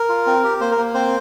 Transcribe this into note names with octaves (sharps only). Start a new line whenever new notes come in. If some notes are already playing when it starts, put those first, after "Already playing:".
Already playing: A#4
F4
C4
G4
A#3 C5
A#4
A#3
C4 C5